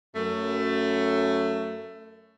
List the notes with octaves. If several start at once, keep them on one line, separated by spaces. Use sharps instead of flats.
F#2 A3